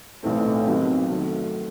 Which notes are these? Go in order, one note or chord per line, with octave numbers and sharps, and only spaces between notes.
B1 A2 E3 A3 C4
F2 C3 D#3 F#3 B3
D#3 F#3 A3